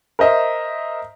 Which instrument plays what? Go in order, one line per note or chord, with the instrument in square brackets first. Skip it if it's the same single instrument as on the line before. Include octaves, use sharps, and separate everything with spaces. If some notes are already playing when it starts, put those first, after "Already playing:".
[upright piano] A#4 C5 D#5 E5